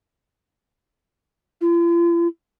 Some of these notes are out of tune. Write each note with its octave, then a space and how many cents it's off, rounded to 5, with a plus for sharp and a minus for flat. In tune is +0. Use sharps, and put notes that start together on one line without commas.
F4 -45